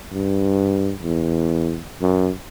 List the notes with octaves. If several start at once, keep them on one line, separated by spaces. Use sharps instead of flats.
G2
E2
F#2